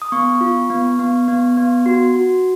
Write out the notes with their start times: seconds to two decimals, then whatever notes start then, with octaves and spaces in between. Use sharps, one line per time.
0.02 D#6
0.12 B3 C#6
0.41 F4
0.70 B3
0.99 B3
1.28 B3
1.57 B3
1.86 F#4
2.16 F#4